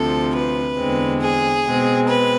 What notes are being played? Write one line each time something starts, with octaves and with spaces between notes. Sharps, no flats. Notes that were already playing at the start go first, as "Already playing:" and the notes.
Already playing: D2 C3 F3 A4
B4
E2 D3 G#3 C4
G#4
B2 G#3 C4
B4